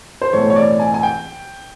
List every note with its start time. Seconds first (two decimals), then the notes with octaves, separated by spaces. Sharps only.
0.21 C5
0.32 B1 A2 E3 A3 C4 C#5
0.50 C#5
0.56 D5
0.80 G#5
0.94 G#5
1.03 G5